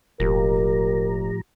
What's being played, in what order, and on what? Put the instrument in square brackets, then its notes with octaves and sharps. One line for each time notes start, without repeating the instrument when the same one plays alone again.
[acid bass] E1 [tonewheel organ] A2 F3 A#5 [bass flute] G4 [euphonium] A#4